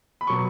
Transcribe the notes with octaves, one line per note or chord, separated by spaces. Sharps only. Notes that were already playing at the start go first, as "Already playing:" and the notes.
B5
B2 F#3 C#6